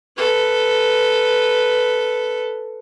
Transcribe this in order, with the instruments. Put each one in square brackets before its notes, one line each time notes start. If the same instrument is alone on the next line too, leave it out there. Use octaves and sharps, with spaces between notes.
[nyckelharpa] A4 B4